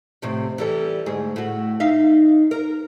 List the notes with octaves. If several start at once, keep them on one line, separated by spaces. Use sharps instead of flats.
F2 A2 C3
E3 G3 A4
D2 G#2 G#4
A2 F#4
D#4 E5 F5
A#4